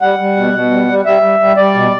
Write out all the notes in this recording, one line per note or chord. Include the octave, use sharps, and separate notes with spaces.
G3 F#5
G3
B2
B2
G3
G3
G3 E5
G3
G3
G3 D5
B2